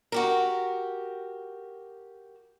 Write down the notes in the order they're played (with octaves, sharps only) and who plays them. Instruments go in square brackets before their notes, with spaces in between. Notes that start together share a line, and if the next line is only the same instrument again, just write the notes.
[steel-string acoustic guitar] F#4 G4 A#4